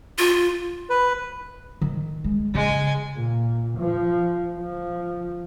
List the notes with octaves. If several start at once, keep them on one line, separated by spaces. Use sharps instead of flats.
F4
B4
D#3
G#3
C#3 G#3 G#5
A#2
F3
F3